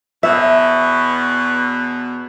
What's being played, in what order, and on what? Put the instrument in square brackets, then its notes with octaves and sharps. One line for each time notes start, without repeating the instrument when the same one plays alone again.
[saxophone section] E2 B2 [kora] E5